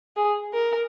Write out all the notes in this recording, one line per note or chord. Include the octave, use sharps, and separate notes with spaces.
G#4
A#4